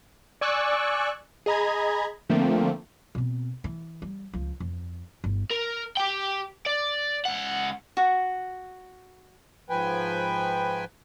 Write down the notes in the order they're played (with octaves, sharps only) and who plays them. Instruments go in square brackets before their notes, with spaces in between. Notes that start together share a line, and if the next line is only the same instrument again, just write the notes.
[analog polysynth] D5 G#5 C#6 D6 E6 F#6
G#4 D#5 A#5 B5 G#6
D3 F3 A3 A#3 C4
[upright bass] B2 C4
E3
G3
C#2 F3
F2
G1 E4
[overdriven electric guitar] A#4
G4 G5
D5
C#2 F#5
[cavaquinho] F#4
[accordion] G#2 F3 B4 G5 G#5